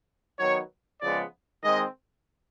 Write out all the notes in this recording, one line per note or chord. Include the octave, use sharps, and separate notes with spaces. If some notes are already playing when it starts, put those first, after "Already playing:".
D#3 F#3 B3 C#5
C#3 F3 G#3 B3 D5
D#3 G#3 C4 D#5